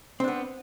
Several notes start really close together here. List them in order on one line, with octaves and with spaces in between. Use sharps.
C4 D4 B3